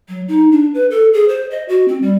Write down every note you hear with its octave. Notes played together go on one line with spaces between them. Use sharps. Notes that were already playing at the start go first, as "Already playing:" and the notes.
F#3
D#4
D4
B4
A4
G#4
C5
D#5
F#4
C4
G3